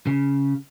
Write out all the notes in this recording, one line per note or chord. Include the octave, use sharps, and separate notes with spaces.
C#3